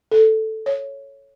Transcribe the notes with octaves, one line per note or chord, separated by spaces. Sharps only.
A4
C#5